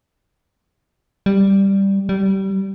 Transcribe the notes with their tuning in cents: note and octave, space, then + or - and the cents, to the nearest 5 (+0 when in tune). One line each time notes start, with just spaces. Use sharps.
G3 +0
G3 -25